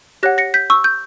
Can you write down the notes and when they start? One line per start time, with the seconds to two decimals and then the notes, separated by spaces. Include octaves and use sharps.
0.23 G4 C#5 F#5 F#6 A#6
0.38 A#6 C#7
0.54 G6 B6
0.70 C#6 E6
0.84 G6